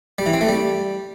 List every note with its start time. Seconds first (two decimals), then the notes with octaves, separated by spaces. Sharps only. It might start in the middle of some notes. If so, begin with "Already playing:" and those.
0.18 G3
0.26 E3
0.34 C4
0.41 A3
0.49 G3